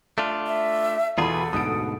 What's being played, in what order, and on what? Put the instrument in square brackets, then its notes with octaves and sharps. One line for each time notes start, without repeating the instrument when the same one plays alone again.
[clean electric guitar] A3 D4 F4
[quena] E5
[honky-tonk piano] E2 B5 [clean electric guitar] B2 F4 G#4 [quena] A4
[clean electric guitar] D2 G#2 B2 [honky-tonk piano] D#6 D7